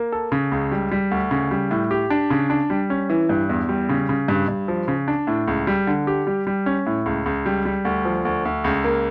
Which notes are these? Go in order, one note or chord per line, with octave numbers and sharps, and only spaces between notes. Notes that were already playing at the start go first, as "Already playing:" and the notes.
Already playing: A#3
A4
C#3
C#2
G3
G3
D2
C#3
G3
A2
G4
D4
C#3
D4
G3
C#4
E3
G2
E2
G3
C#3
C#3
G2
G2
F3
C#3
D4
A2
C#2
G3
D3
G4
G3
G3
C#4
A2
C#2
C#2
G3
G3
D2
F3
D2
D2
C#2
A#3